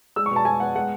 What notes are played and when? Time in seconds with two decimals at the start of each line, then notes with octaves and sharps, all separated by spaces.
0.16 G#3 E6
0.26 C#6
0.31 B2
0.36 A5
0.45 G#3 G#5
0.60 B3 F#5
0.75 G#3 F#5